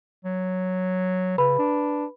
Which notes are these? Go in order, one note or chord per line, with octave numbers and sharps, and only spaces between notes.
F#3
C#3 B4 B5
D4